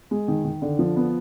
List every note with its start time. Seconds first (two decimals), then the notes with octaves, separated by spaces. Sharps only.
0.11 G#3
0.28 D#3
0.44 D#3
0.62 D3
0.79 F3
0.96 B3